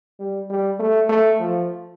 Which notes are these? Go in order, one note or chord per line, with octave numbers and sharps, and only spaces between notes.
G3
G3
A3
A3
F3